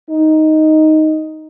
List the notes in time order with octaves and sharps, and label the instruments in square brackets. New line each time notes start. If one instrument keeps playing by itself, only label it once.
[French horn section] D#4